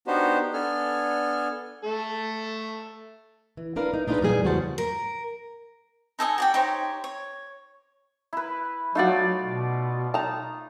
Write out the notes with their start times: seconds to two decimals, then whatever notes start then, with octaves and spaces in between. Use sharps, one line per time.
0.07 B3 D4 D#4 F#4 G4 C5
0.54 B3 D4 A4 G#5 F6
1.83 A3 A4
3.57 E3
3.76 D4 A#4 B4 F5
3.94 D#4
4.08 D4 D#4 F4 G4 G#4 B4
4.21 E2 A#2 G3 G#4 G#5
4.44 E2 C#3 C#4 F#4 C5 A5
4.78 A#4
6.19 D#4 A4 D#5 G#5
6.38 F#4 D5 G5
6.54 D#4 G4 C5 C#5
7.04 C#5
8.33 E4 B4
8.95 F#3 A3 D#4 F4 F#4 D5
9.43 B2
10.14 D#4 A5 A#5